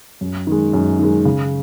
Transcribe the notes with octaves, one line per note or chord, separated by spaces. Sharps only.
F#2
D#3 G#3
F#2
D#3 G#3
C#3